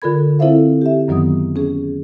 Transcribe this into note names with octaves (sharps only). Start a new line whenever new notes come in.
D3 F4 A4 A#4 B5 G#6
C4 E4 A4 C5 E5 F5
G4 E5
F#2 D#3 F#3 B3 D#6
C#4 G#4